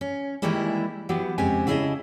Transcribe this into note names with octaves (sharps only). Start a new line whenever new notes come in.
C#4
D#3 E3 G3 G#3 A#3 E4
E3 F#3 B3 G4
F2 C#3 G#3 C4 G4 G#5
C#3 E4 G#4 A4 D#5 A5